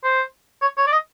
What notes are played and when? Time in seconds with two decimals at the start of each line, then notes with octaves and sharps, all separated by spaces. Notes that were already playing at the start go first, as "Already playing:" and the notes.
0.04 C5
0.62 C#5
0.77 C#5
0.87 D5
0.92 D#5